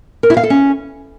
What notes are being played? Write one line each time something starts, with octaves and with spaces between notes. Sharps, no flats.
A#4
E4
F5
A4
C#4